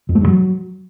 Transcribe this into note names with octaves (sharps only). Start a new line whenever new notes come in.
F2
A3
G2
F#3